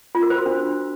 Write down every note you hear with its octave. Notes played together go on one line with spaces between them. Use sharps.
F4
A#4
C5
F#4
D4